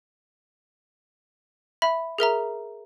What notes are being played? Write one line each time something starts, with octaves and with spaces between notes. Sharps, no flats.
E5 B5
G#4 A#4 E5 A#5